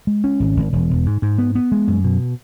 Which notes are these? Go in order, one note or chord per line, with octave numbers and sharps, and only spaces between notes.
G#3
C#4
G#1
G#1
E1
E1
G#2
G#2
B3
B3
G#3
F#2
B2